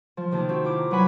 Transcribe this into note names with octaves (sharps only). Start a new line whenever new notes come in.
F3
C3 D#3 A#3 A5
C4 F#4
E4 F4 D6
A#5
F#3 B4 F#5 G#5 B5 F#6